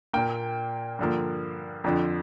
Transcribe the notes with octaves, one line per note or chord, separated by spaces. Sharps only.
A#2 A#3 G5
G2 D3 F3 A#3
F2 D3 F3